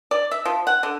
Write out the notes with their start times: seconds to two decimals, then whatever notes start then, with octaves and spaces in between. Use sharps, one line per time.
0.11 D5
0.31 E5
0.45 F3
0.67 F#5
0.83 D3